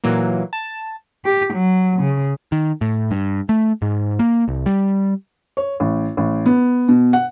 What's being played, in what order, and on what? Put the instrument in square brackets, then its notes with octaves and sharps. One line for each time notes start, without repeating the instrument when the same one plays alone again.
[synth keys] A#2 E3 F#3 A#3
A5
[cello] G4
F#3
C#3
[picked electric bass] D#3
A2
G2
A3
G#2
A#3
C2
G3
[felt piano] C#5
A1
A1
B3
B2
F#5